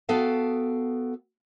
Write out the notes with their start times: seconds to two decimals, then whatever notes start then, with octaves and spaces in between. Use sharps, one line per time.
0.09 B3 F#4 A4 F5 G5 A5